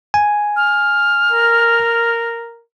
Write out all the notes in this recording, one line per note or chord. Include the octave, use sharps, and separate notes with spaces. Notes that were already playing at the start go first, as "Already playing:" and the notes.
G#5
F6
A#4